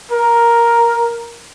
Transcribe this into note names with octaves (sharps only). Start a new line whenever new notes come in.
A#4